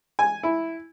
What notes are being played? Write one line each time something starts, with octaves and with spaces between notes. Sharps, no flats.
G#5
E4